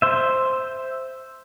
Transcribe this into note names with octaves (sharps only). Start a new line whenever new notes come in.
C5 E5